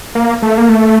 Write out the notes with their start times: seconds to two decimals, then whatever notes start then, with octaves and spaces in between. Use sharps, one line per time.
0.15 A#3
0.42 A3
0.58 A#3
0.69 A3